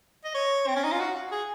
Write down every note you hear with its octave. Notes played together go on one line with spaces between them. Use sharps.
D#5
C#5
C4
C#4
D#4
F4
F#4
G#4